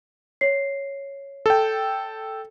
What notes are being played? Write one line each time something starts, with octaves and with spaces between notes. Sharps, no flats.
C#5 C7
A4 G5